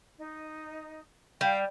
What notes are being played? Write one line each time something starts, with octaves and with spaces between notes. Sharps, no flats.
D#4
G3 F5 G5